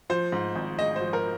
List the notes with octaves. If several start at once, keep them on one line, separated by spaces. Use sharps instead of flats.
F3 C5
G#2
G#1
G#3 D#5
F3 C5
A#4